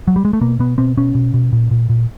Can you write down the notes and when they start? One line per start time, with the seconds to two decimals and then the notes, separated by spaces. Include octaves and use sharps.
0.08 F#3
0.16 G3
0.25 G#3
0.33 A3
0.41 B2 A#3
0.59 B2 B3
0.78 B2 C4
0.97 B2 C#4
1.15 B2
1.34 B2
1.53 A#2
1.71 A#2
1.89 A#2